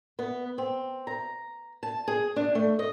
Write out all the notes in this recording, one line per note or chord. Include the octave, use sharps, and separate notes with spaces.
B3
C4
A#5
A5
G#4
D4
A3
D#5